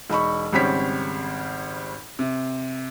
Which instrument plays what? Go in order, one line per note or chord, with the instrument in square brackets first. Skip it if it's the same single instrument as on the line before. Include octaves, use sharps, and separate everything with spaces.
[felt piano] E1 D#4 B5 C#6
G#1 C#3 G3 C4 C#5 B6
C3